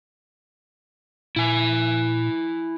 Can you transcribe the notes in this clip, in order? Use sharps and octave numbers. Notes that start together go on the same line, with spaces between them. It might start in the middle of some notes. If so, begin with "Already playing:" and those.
A#2 E4 G#5